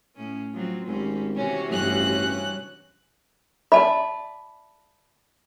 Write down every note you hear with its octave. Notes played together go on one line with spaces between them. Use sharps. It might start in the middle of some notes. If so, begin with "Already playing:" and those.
A2 C#4
F3 F#3 C4
G#1 C4 C#4 G4
C3 E3 C#4 F#4
A1 G2 C#4 F#6
D5 E5 A5 B5